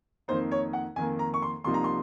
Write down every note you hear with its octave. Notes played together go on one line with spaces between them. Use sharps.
F2 D#3 A#3 D#4 C5
C#5
F#5
F2 D#3 A#3 G#5
A#5
C#6
C6
C2 C3 F3 A#3 D#4 C6
A#5
C6